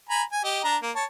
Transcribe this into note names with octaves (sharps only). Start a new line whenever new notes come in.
G#5 A#5 B5
G#5
G4 D#5
D4 A#5
A#3
C#5 A5